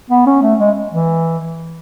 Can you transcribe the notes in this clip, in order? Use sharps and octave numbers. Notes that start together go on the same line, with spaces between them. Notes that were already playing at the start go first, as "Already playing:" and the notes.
B3
C#4
A3
G#3
E3